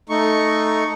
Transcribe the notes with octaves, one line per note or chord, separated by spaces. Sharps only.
A3 D#4 C#6